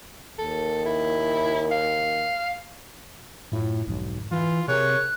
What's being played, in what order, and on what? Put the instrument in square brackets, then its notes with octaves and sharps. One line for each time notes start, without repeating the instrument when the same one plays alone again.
[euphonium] D#2 [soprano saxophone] A4
[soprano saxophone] E4
F5
[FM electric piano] F#2 E4 F4 [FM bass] A2
[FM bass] B1 [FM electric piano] F2 G#2 D3
[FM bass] E3 [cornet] F4
[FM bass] C3 [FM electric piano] G#4 A#4 [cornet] C#5 [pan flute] F#6